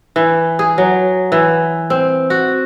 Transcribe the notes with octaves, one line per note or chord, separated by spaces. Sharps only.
E3
G#4
F#3
E3
C4
F#4